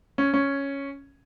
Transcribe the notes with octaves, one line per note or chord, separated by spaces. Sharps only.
C#4
C#4